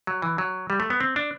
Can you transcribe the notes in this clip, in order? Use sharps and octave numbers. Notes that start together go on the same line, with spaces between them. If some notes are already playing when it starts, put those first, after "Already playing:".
F#3
E3
F#3
G3
A3
B3
C4
D4